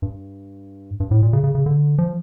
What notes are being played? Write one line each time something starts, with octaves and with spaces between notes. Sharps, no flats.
G2
G2
A2
A#2
C#3
C#3
C#3
D3
F3